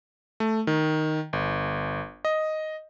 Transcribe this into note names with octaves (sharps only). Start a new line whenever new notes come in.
A3
D#3
G1
D#5